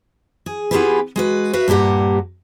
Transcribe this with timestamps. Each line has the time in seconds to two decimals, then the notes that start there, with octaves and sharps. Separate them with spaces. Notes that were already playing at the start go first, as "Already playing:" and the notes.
0.46 G#4
0.71 B3 E4 F4 G4 G#4 B4
1.16 G#3 F#4 B4
1.53 F#4 B4 E5 F5
1.68 G2 A#2 A#3 G4 F#5